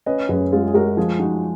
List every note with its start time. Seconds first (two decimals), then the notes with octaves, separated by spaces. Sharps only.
0.06 C#4 B4 D#5
0.29 F#2 G#4 B4
0.52 G#3 F4 G#4
0.67 G#4
0.74 G#3 F#4 A#4
0.97 F3 F4 G#4
1.19 F3 D#4 F#4